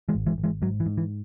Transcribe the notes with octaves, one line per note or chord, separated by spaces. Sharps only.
E3 G#3
G#1
E3 G#3
G#1
E3 G#3
G#2 F#3
E3
G#2
E3